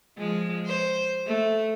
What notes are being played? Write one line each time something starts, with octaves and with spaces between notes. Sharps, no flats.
F3 G#3
C5
A3